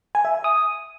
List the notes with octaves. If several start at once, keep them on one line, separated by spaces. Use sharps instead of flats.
G#5
E5
G#5
D#6